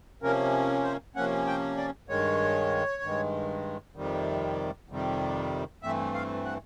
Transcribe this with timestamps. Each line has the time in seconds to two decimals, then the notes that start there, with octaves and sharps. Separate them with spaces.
0.22 C3 F3 A#3 C#4 A#4
0.84 C5
1.16 C3 F3 A#3 C#4 F#5
1.47 G5
1.77 D5
2.09 G2 D#3 G#3 C#5
3.03 G2 D#3 G#3
3.95 F2 C3 D#3 G3
4.89 F2 C3 D#3 G3
5.82 G2 E3 A3 C4 E5
6.14 F5
6.45 F#5